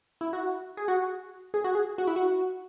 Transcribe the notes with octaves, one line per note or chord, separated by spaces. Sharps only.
E4
F#4
G#4
F#4
G#4
F#4
G#4
F#4
E4
F#4